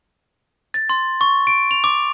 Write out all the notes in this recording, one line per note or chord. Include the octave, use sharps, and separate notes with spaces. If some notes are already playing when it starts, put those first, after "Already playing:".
A6
C6
C#6
D7
F7
D6